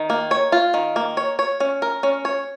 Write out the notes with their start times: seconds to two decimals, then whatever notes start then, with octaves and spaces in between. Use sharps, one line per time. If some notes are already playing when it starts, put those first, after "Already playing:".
Already playing: D#3
0.10 A#3
0.31 C#5
0.52 F4
0.74 D#3
0.96 A#3
1.17 C#5
1.39 C#5
1.60 C#4
1.82 A#4
2.03 C#4
2.25 C#5